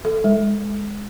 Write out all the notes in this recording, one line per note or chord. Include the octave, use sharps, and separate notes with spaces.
A4
G#3